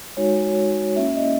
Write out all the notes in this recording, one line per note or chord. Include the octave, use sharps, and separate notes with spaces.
G#3 D#4 F#4 C#5
A#3 C#4 E4 E5
D#5